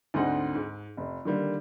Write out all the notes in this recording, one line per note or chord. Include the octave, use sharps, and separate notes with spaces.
D2 G#2 D3 C4 D#4 F#5
G#2
F1
D3 D#3 G3 A#3